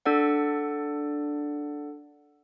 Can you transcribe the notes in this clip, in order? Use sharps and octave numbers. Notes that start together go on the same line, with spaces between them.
D4 A4 D5 F#5